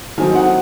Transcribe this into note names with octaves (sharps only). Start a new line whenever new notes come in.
D#3 F#3 C4 D#4 G#5
F#5